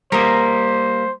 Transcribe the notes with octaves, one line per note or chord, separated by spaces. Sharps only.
G3 A#3 A#4 C5 D#5